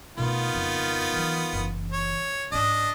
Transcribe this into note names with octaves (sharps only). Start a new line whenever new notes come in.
B2 D#3 A3 B3 F4
F2 C#3
E3 F#3
F#1 E3
C#5
G#2 C#4 D4 D#5